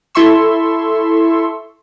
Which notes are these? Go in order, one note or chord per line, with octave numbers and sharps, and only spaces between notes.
E4 A4 E5 C6 C#6 E6